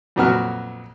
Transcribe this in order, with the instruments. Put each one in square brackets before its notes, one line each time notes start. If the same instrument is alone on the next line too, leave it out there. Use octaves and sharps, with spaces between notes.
[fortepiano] F2 A#2 F#3 B3 F#4 F6